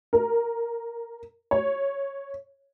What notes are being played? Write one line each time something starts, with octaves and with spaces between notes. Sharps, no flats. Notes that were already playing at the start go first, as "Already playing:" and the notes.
A#4
C#5